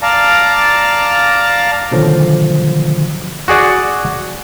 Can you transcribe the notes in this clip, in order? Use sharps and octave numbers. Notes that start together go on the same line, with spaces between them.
D5 F5 A5 A#5
B2 D3 D#3 F3 F#3 A3
F#4 G#4 D5 F#5